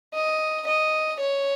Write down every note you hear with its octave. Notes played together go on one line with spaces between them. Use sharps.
D#5
D#5
C#5